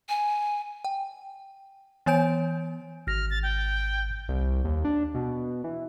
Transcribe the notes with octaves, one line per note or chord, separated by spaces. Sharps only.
G#5
G5
E3 B3 C#5 G#5 G6 D7
G#1 F6 A#6
A6
G5
C2
D#2
D4
B2
E3